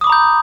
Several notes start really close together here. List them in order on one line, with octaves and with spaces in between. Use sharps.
D#6 D6 B5 A#5 G6